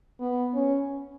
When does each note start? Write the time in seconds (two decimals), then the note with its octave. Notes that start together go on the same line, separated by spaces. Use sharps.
0.20 B3
0.54 C#4